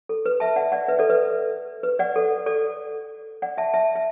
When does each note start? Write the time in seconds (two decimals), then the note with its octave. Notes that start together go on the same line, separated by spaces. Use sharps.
0.09 A4
0.26 B4
0.40 E5 A5
0.56 D5 F#5
0.72 D5 F#5
0.88 B4 E5
0.99 A4 D5
1.10 B4
1.83 B4
1.99 D5 F#5
2.16 A4
2.46 A4 D5
3.42 D5 F#5
3.57 E5 A5
3.73 E5 A5
3.95 E5